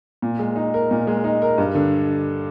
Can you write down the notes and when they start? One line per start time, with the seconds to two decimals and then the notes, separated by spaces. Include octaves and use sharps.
0.22 A#2
0.39 G#3
0.56 D#4
0.74 A#4
0.91 A#2
1.07 G#3
1.24 D#4
1.42 A#4
1.58 G2
1.75 D3